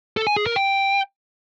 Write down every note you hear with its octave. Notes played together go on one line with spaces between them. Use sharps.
A4
G#5
G#4
A#4
G5